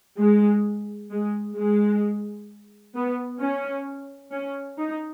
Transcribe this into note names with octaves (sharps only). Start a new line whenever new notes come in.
G#3
G#3
G#3
B3
C#4
C#4
D#4